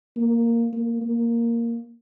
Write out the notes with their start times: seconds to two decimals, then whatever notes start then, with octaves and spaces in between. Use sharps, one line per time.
0.17 A#3
0.73 A#3
1.02 A#3